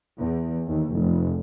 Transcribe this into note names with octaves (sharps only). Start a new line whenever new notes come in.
E2
D#2
F1